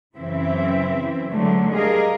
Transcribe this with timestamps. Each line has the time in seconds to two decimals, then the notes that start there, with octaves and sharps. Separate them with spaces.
0.17 F#2 C#3 E3 C4 E4 E5
1.31 D3 F#3 G#3 A3
1.73 G3 G#4 A#4 D#5 F5